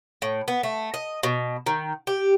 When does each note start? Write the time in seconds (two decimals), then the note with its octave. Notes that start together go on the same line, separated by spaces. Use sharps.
0.22 A2
0.48 B3
0.63 A3
0.94 D#5
1.23 B2
1.66 D#3
2.07 G4